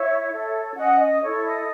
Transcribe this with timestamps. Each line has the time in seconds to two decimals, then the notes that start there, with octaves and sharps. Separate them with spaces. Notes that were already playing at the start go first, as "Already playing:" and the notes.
Already playing: E4 C#5 E5
0.31 A4 C#5
0.76 C#4 D#5 F#5
0.99 D#5
1.22 E4 A4 C#5
1.45 D#5